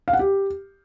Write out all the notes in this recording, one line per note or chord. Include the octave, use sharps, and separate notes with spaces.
F5
F#5
G4